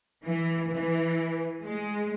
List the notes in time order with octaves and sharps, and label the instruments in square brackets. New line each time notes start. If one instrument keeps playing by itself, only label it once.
[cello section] E3
E3
G#3